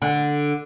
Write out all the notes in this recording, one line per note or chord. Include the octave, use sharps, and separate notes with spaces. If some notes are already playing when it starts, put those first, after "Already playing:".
D3